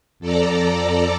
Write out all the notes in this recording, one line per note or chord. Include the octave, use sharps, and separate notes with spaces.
F2 A4 D5 A#5